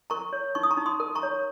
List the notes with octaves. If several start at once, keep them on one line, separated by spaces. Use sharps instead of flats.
A#4 A#5 C#6
C#5
D#4 C#6
D#6
A#5 C#6
D#4
C6 D#6
A#4
A#5 C#6
C#5